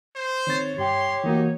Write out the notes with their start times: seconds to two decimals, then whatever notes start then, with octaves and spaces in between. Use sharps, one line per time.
0.16 C5
0.47 D#3 C4 C#5 A6
0.78 G2 G4 G5 C6
1.24 E3 A#3 D#4 F#4